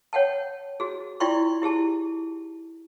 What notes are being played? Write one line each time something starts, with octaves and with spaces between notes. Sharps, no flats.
C#5 F#5 G5 A5
F#4 G#4
E4 F4 D5 G5 C6 C#6
E4 G4 G#4 A5